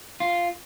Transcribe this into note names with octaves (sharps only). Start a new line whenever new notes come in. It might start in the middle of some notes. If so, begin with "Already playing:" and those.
F4